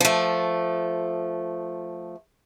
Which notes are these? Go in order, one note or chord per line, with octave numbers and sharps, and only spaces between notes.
F3 A3